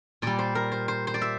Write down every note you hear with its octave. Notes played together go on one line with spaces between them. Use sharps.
A#2 G3 D5
C5
A#4
C5
C5
C5
D5
E5